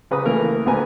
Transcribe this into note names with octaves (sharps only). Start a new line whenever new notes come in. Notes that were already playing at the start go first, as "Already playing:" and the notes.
C#3 B4 A#5 D#6
E3 A3 A#3 A#4
D2 A3 B3 B4 G#5 A#5